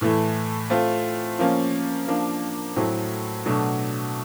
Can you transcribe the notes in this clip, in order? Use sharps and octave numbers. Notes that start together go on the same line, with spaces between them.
A2 E3 A3
A3 C4 F4
F3 A#3 C#4
F3 A#3 D4
A2 F#3 A3 C4
B2 F#3 A3 D4 F#4